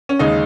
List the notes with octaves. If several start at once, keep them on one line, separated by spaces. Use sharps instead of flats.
C#4
D#2 C#3 G#3 D#4